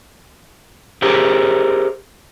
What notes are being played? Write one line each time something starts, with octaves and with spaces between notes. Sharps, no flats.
G4 G#4 A#4 C5